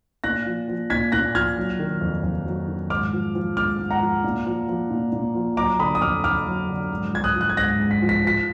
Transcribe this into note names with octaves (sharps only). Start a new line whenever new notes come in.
A#2 F#6 A#6
F3
F3
A#2 G#6 B6
A#2 F#6 A#6
F3 F6 G#6
F#3
D#3
F2
F2
F#3
D#3
G#2 D6 F6
F3
F3
G#2 D6 F6
G#2
F#5 A#5
F3
A#2
F3
F3
A#2
A#2
F3
F#3 A#5 D6
D3 B5 D#6
D#6
F2 D6 F6
F2 D6 F6
F#3
D3
G#2
F3 G#6
D#6 F#6
F3
F#6
G#6
G#2 F#6 A#6
G#2
B6
F3
B6
F3 B6